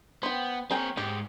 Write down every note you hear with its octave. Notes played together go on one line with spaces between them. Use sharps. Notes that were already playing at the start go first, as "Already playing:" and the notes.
B3 C5 G5
C4 G#4 A#4 C#5 G5
G#2 G#3 G4